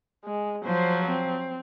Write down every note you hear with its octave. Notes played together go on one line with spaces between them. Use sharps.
G#3
F3 F#3 C5
C4